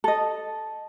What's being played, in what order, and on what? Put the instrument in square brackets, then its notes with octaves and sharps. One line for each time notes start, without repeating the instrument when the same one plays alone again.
[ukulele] A4 D#5